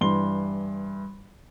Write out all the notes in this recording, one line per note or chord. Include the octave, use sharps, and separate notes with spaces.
G2 E3 C6 G7